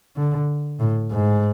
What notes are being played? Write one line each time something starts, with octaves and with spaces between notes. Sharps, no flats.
D3
A2
G#2